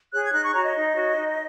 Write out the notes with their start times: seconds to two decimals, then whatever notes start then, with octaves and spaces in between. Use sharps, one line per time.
0.11 G#4 C#5 F#6
0.24 G#6
0.32 D#4 F#6
0.43 C#6
0.53 F#4 C#5 A#5
0.64 D#5
0.74 D#4
0.94 F#4 C#5
1.15 D#4